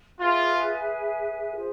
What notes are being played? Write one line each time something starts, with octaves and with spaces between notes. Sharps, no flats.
F4 G#4 B4 E5 G#5
F4 G#4 C5